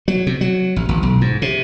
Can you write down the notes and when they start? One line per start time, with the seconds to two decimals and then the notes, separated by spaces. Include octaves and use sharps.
0.08 F#3
0.27 C3
0.41 F#3
0.76 A1
0.89 G#1
1.03 B1
1.21 G#2
1.42 C3